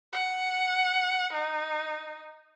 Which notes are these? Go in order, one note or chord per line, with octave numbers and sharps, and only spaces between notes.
F#5
D#4